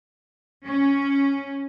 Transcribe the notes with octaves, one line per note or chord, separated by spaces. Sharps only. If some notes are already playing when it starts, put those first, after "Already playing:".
C#4